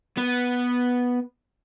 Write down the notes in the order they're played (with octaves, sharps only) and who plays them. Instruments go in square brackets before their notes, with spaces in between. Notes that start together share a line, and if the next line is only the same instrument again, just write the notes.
[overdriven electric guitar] B3